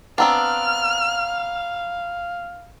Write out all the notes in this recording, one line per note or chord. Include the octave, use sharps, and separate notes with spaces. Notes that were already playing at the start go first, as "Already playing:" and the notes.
B3 C4 D4 F5 F#5 A#5 E6 F6